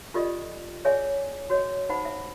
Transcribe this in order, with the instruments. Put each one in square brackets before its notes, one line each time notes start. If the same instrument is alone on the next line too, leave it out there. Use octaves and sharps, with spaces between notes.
[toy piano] F4 G4 A4 D5 D#5
G#4 C#5 D5 E5 G#5
F#4 C#5 D#5
D#4 C5 F#5 B5
E5